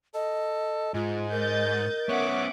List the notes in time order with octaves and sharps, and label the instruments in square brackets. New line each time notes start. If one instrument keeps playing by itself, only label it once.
[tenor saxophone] A4 [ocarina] D#5
[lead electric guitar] G#2 [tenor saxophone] G#3 [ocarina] F4
[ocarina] A#4 [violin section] D#5 G6 A6
[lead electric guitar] B3 C#4 [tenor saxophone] C#5 [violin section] E5 F#5 D6